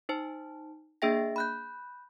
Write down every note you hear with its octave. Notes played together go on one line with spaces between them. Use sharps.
D#4 C5 A5
A#3 D4 G#4 E5 G5 A#6
B5 F#6 G6